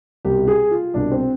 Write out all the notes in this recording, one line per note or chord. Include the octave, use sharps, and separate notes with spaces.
C2 B2 G4
G#4
F4
C2 B2 D4
C4